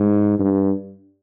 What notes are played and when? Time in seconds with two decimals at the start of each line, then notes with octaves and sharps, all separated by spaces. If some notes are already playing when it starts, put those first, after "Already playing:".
Already playing: G#2
0.39 G2